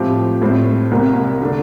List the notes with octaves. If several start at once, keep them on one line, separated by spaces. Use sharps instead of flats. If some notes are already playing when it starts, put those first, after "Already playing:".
Already playing: A2 F3 C4 G4
A2 G3 C4
C2 C3 G3 A#3
D3 A3 D4